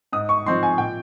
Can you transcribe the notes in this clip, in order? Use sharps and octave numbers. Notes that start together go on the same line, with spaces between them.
G#2 D#6
C#6
F3 C4 D#4 C6
G#5
A#2 G5